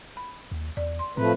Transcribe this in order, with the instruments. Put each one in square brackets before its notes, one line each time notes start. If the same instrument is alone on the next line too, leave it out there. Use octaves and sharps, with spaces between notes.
[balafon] B5
[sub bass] D#2
[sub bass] E2 [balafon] D5
[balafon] C6
[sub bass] A2 [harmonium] F3 A3 B4 [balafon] C4